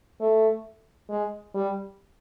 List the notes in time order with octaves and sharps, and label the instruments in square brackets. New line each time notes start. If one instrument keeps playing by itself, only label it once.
[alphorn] A3
G#3
G3